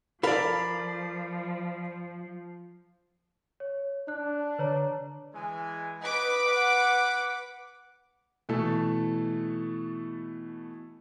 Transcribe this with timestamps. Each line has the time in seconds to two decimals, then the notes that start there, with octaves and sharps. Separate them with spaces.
0.23 F3 A4 A#4 D5 F5 B5
3.60 C#5
4.08 D4 F#6
4.59 D3 B4 C#5 A#5
5.33 E3 G#3 G#5
6.01 B4 D#5 F#5 D6
6.45 F#5
8.49 B2 E3 A3 A4